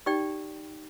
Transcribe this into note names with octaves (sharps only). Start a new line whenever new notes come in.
D#4 G4 D5 G5